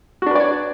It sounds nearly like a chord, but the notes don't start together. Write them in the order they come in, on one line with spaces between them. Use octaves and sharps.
F#4 D4 B4 D5 C#5